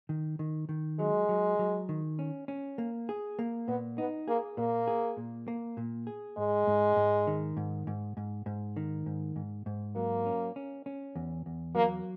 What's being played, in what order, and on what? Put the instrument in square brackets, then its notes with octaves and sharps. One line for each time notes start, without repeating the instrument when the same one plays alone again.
[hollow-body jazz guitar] D#3
D#3
D#3
[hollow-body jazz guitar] F#3 [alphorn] G#3
[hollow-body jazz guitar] F#3
F#3
D#3
C#4
C#4
A#3
G#4
A#3
[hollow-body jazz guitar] A#2 [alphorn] B3
[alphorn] B3 [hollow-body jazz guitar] D#4
[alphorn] A#3 [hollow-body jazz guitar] G#4
[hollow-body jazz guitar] A#2 [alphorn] A#3
[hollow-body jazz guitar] G#4
A#2
A#3
A#2
G#4
[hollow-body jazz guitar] G#2 [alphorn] G#3
[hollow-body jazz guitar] G#2
G#2
D#3
G#2
G#2
G#2
G#2
D#3
G#2
G#2
G#2
[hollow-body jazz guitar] F#3 [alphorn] A#3
[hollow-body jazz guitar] C#4
C#4
C#4
E2
E2
[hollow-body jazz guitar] F#3 [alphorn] A#3